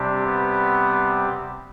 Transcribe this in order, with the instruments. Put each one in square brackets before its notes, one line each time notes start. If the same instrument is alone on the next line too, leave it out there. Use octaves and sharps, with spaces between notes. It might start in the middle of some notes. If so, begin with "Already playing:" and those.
Already playing: [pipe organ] C3 G3 C4 G4 [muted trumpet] D4
[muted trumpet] B3